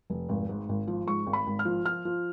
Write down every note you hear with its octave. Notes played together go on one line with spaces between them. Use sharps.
F1
G#1
G#2
G#1
F3
G#2 C#6
G#1
B5
G#1
F6
F3
F3 F6
F3